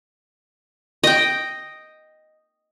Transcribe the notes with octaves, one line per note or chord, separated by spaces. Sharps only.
D#5 G5